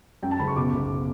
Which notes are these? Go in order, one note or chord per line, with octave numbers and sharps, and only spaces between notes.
F#2 G5
A5
F#1 B5
C#6
B2 D6
B1